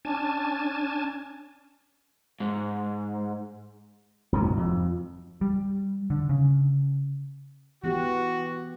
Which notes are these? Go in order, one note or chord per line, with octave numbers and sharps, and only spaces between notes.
C#4 D4 G#5 A5
G#2
D#1 G#2 C3 F#3
F2
G3
D3
C#3
E3 B3 F#4 G4